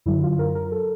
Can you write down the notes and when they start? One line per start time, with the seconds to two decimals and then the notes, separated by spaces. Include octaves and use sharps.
0.06 F#2 D3 F#3 E4
0.23 F4
0.39 A#4
0.55 A#4
0.72 A4